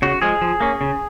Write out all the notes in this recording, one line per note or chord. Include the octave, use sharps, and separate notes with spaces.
C#3 F#4
F3 G#3 G#4
F3
A#3 C#4
C#3